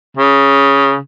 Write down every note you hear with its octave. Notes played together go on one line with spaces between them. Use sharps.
C#3